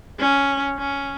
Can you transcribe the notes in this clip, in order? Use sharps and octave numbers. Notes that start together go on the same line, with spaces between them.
C#4
C#4